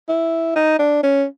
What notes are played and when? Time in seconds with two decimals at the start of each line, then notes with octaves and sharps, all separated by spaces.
0.09 E4
0.56 D#4
0.79 D4
1.03 C#4